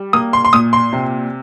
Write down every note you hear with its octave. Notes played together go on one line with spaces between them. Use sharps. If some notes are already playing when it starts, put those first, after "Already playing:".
Already playing: G3
A#3 D#6
C6
C6
A#2 D#6
C6
C3